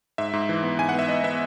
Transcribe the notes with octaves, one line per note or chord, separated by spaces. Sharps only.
G#2 E5
G#2
E3
B3
G#2 G#5
F#5
B3 E5
B3 D#5
B3 E5